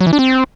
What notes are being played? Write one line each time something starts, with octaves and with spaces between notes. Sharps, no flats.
F#3
E3
D4
C4